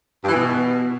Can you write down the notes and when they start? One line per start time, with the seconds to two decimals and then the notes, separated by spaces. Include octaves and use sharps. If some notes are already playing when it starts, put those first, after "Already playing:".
0.23 G2
0.29 E3
0.34 B2